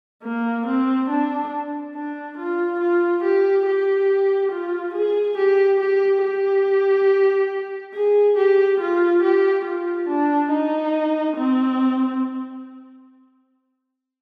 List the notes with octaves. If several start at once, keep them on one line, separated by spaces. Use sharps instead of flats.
A#3
C4
D4
D4
F4
F4
G4
G4
F4
G#4
G4
G4
G4
G#4
G4
F4
G4
F4
D4
D#4
C4